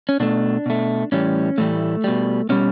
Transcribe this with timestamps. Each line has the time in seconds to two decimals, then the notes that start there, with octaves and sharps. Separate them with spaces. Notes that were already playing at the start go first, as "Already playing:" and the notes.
0.09 C#4
0.20 B2 A3 D4
0.66 B2 A3
1.12 A2 E3 G3 C#4
1.58 A2 E3 G3 A3
2.04 B2 G3
2.49 B2 G3 C#4